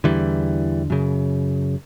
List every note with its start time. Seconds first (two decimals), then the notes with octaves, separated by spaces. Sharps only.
0.04 E2 D3 E3 G3
0.90 F#2 C#3